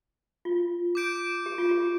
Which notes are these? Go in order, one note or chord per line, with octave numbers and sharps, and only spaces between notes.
F4
D6 G6 D7
G4
F4
G4